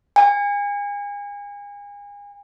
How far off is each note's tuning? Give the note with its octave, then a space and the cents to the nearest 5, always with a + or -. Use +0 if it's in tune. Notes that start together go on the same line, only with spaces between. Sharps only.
G#5 -35